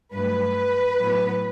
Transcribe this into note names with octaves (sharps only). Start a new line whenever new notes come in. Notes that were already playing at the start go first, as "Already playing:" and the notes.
G2 F#3 A3 B4
A2 F#3 B3